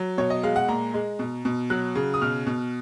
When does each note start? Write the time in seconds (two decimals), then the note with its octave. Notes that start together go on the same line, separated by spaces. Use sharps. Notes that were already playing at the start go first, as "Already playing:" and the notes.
Already playing: F#3
0.18 B2 C#5
0.30 D#5
0.43 G#3 F5
0.56 F#5
0.68 A#2 A#5
0.94 G#3
1.19 B2
1.45 B2
1.70 F#3 F#6
1.95 C#3
2.14 D#6
2.22 B2 F6
2.47 B2